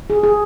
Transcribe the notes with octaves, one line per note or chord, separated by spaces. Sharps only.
G#4
G#4